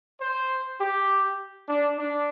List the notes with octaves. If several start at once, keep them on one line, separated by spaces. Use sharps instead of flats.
C5
G4
D4
D4